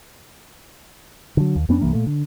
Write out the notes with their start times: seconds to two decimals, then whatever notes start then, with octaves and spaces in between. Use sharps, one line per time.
1.37 D3 F#3
1.56 D#2
1.69 F2 B3 C#4 D4
1.81 C2 G2 E3 A#3
1.93 A#2 A3
2.07 D3